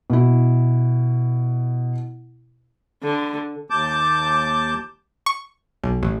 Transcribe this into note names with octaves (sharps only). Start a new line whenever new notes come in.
B2 E4
D3
D#2 A5 D6 G6
C#6
B1
A1